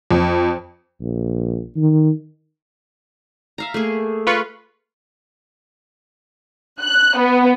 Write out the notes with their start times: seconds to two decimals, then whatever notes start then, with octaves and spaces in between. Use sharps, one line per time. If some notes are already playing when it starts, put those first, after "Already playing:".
0.11 F2
1.01 A#1
1.77 D#3
3.58 E5 F5 A#5
3.74 A3 A#3 G#4
4.27 F4 B4 C#6
6.81 F#6
7.18 B3